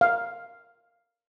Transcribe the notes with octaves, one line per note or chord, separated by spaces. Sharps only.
F5